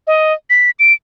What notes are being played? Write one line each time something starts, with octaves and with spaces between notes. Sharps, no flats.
D#5
B6
D7